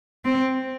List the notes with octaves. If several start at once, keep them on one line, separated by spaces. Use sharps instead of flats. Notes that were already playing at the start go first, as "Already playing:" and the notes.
C4